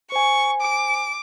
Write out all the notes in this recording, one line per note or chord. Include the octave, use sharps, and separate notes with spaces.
C5 G#5 C#6
D6